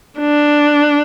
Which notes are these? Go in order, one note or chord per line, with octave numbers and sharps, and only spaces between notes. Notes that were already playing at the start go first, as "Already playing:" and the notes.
D4